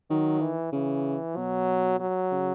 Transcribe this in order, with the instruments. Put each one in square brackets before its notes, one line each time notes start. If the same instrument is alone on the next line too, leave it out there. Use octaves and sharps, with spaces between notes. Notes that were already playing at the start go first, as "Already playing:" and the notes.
[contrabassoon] D#3 [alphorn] F#3
[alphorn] E3
[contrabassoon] C#3 [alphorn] E3
[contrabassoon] B2 [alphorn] F#3
[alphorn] F#3
[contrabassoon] C#3